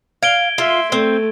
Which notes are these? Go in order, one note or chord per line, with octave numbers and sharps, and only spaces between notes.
F5 G#6 D7 G7
F4 E5 C6
A3 C4